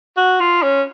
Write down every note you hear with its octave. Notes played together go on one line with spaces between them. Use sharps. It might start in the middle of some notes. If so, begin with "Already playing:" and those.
F#4
F4
C#4